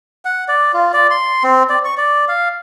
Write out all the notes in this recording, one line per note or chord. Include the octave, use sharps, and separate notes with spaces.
F#5
D5
F4
D5
C6
C4
D5
C#6
D5
F5